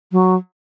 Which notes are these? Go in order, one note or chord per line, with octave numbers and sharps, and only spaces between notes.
F#3